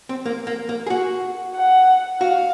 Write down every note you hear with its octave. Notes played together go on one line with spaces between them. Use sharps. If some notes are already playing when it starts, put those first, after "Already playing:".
C4
A#3
A#3
A#3
G#4
F#4
F#5
F#4 F5